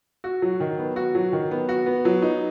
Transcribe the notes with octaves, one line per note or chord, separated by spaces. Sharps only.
F#4
F#3
D#3
B3
F#4
F#3
D#3
B3
F#4
B3
F#3
D#4